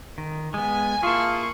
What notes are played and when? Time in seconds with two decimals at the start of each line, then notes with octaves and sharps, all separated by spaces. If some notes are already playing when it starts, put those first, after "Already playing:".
0.18 D#3
0.54 G#3 B3 G#5
1.03 A#3 E4 F4 G#4 A5 C#6